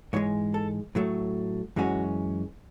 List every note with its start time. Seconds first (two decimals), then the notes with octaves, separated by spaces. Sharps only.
0.13 G#2 E3 G#3 C#5
0.54 A4
0.95 A2 F#3 A3
1.76 F#2 E3 G#3 C#4 F#4